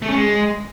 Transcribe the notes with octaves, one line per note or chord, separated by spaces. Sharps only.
A3
C#4
G#3